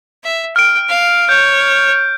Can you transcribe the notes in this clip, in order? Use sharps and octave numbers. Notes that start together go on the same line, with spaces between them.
E5
G5 F6 D7
F5
C#5 G6